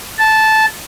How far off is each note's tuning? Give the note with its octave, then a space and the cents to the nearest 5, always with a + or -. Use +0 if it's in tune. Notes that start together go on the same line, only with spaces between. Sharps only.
A5 -10